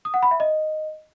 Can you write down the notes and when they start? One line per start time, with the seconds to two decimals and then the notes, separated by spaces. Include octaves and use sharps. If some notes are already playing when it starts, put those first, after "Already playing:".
0.05 D#6
0.14 F#5
0.22 B5
0.31 E5
0.40 D#5